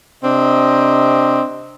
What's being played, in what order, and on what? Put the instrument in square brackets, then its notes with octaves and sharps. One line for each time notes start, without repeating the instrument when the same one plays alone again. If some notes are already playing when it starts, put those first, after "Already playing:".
[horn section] C3 C4 D4 D#5